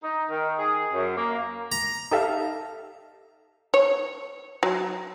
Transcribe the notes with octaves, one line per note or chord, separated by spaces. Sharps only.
D#4
D#3
G#4
F#2
A#3
A#5
D#4 G4 A4 E5 F5
C#5
F#3